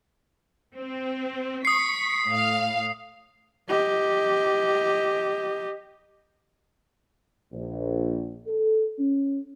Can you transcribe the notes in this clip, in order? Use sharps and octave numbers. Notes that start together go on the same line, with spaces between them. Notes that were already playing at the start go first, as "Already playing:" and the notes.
C4
C#6 D#6 B6 C7
A2 F5
G4 D#5
A#1
A4
C#4